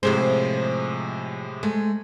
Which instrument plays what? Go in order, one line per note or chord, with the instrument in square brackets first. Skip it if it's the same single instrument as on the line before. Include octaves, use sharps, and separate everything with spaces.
[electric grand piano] A2 C3 G#3 [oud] F3 G#4 C5
[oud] G#3 [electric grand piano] A3